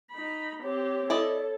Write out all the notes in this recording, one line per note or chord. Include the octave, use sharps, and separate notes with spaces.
D#4 B5
C4 G4 C#5
E4 A4 D5 D#5